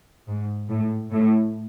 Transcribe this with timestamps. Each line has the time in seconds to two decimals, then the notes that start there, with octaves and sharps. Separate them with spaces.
0.27 G#2
0.70 A2
1.12 A2